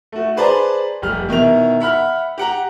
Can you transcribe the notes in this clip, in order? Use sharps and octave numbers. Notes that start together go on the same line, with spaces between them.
A3 F#4
G#4 B4 C5 D5 A5 A#5
F1 G3 F6
B2 D#3 E4 F7
E5 F#5 B5 F6
G4 F#5 A#5